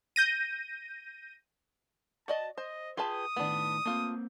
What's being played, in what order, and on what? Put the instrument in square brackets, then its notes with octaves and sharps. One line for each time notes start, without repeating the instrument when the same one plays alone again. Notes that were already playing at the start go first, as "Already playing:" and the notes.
[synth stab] G6 A#6 D#7
[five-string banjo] F#4 D5 D#5 [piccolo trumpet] A5
[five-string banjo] C5 [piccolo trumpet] D#5
[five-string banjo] F4 B4 A5 [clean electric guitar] G#4 G5 [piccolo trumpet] D#6
[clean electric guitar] A2 D#3 [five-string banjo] B3 D4
[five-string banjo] A3 F4 [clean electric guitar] A#3 C4